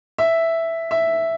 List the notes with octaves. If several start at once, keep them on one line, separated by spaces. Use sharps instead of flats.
E5
E5